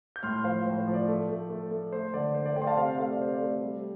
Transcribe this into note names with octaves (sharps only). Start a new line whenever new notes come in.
G6
A2 C6 F6
F3 C5 F5
A2 C5
C5
F3
D5
A3
A3
A3
A3
A3 C5
D3 D5
D3 C5
D5
A3 D5 G5
C6
F5 A5
C3 C5 F5
A3 F5
D5
C3 C5
D5
A3
G3